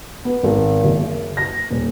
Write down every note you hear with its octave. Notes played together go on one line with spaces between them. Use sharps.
B3
G#1
F#1
A#6
D#1